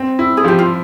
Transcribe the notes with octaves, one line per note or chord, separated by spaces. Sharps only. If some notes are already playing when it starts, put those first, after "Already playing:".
Already playing: C4
E4
G#4
F3 G4
F4